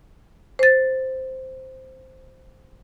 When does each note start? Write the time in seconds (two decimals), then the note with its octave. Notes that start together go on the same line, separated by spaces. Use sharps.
0.59 C5 A6